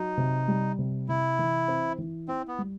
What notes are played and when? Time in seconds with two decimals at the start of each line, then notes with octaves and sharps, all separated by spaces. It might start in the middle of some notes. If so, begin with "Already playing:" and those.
Already playing: F#3 D#4
0.17 C3
0.48 G3
0.78 C3
1.08 C3 E4
1.39 E3
1.68 C4
1.98 E3
2.28 C4 E4
2.48 B3
2.58 G3